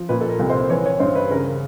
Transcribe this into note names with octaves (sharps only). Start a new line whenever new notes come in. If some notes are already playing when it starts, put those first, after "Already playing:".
Already playing: F3
A#2 B4
A4
A#4
C2
C5
E3 C#5
C#5
G2 C5
B4
C#3 A#4